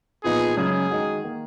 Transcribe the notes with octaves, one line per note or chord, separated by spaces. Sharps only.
A#2 F3 B3 D#4 G#4
F#2 C#3 G#3 G#4
D#3 G#3 D#4 F#4
D#3 A#3